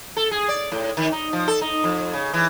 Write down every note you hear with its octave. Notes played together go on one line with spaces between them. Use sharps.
A4
G#4
D5
A2
D#3
D#4
F3
A4
D#4
F2
C#3
E3